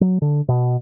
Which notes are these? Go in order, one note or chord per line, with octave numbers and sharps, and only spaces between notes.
F#3
D3
B2